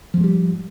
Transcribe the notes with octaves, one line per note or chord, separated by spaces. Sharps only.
G#2 F3 G3 G#3